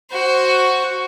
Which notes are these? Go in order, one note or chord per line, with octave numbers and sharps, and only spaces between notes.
F#4 C5